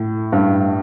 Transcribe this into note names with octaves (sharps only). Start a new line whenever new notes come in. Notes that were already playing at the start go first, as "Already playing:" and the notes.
Already playing: A2
G2